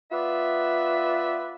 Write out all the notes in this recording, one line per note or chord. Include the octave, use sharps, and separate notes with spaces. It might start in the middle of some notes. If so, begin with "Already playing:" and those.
B3 F4 B4 D5 E5